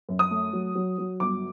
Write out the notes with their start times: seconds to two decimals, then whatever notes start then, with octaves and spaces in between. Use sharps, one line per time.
0.09 F#2
0.19 D#6
0.31 A3
0.53 F#3
0.75 F#3
0.98 F#3
1.20 G1 D6